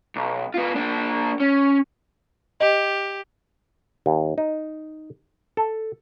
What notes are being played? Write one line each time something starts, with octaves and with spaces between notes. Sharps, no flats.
B1
B3 F4
A#3 D4
C#4
G4 D#5
D#2
D#4
A4